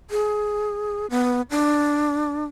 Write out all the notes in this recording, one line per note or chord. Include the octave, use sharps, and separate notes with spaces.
G#4
B3
D4